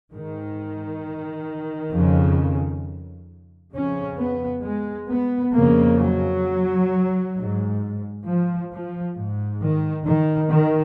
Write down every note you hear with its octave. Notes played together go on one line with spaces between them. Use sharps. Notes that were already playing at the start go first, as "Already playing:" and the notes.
G#2 D#3
F2 C#3
F2 C#3 C#4
B3
G#3
B3
F2 C#3 A#3
F#3
G#2
F3
F3
G#2
D#3
D#3
D#3